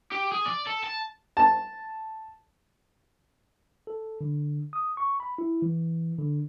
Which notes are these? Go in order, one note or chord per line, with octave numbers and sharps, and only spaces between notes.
G4
G#4
D5
A4
A5
A5
A4
D3
D#6
C#6
B5
E4
E3
D3